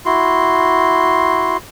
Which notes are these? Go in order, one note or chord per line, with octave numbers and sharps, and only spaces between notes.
E4 F#4 C6